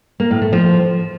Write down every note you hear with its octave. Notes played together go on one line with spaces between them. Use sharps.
A#3
A2
A3
F3